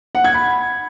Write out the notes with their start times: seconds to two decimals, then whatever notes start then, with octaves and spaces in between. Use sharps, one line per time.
0.15 F#5
0.24 G#6
0.34 B5